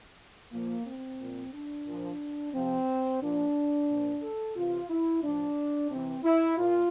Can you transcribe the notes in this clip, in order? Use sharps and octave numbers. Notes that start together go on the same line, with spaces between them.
A#2 F3 A#3
C4
A#2 F3
D4
A#2 F3
C3 F3 C4
A#2 F3 D4
A#2 F3
A4
C3 E3 F4
E4
A2 F3 D4
C3 E3 C4
E4
A#2 F4